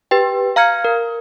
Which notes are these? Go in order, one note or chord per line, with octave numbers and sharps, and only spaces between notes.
G4 B4 G5
F5 A#5 F6 G#6 C#7
A#4